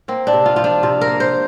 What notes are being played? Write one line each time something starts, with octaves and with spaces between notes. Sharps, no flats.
A#3 C4
D4
C3
F4
F3 F4
D4
C3 F4
A#4
A#3
C5